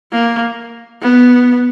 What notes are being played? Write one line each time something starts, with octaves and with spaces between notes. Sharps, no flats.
A#3
B3